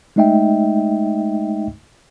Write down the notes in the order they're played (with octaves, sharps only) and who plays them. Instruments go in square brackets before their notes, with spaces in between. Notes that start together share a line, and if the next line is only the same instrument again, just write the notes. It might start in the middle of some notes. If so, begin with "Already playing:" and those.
[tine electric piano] G#3 A3 D#4 D#5 E5 G5